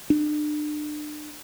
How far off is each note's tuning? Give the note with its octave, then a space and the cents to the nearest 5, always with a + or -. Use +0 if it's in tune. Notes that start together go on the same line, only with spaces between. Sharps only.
D4 +40